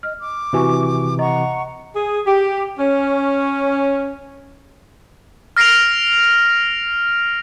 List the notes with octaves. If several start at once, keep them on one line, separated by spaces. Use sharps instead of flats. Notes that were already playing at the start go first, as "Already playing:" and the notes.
D#5 F6
D6
C3 E3 F#4 G#5 C#6
D#5 F#5 A#5 C#6
G#4
G4
C#4
F6 A#6 C7 D7 F7